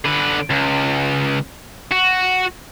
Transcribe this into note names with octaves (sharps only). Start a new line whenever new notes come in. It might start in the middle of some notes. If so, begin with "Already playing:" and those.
D3 B4
C#2
F#4